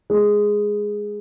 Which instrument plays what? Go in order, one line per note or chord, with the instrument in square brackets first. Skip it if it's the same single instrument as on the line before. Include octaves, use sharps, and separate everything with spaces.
[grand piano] G#3